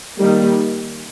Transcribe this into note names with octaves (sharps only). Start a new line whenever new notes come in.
D#3 G3 A#3